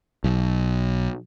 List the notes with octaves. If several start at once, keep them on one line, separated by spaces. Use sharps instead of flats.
B1